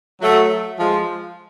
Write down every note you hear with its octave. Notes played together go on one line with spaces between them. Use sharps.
F#3 A3
F3 G#3